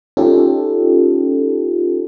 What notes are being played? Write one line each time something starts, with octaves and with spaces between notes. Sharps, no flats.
C#4 D#4 F4 G4 A4